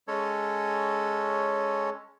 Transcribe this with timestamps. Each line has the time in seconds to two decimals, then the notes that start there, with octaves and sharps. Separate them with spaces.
0.08 G#3 C#4 A4 C#5